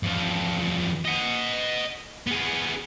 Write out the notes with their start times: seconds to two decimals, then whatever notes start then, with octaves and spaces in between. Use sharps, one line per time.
0.03 E2 F3
1.05 D#5 F#5
2.27 B3 G#4